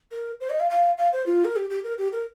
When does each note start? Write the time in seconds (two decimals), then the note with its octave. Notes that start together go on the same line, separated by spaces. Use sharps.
0.12 A#4
0.41 C5
0.50 D#5
0.60 F5
0.70 F5
0.98 F5
1.13 C5
1.26 F4
1.45 A#4
1.56 G4
1.70 G4
1.84 A#4
1.98 G4
2.13 A#4